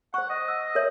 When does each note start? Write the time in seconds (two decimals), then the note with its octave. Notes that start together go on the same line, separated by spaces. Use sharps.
0.14 C5 F#5 C#6
0.30 D#5
0.48 E6
0.75 A#4 C#5 E5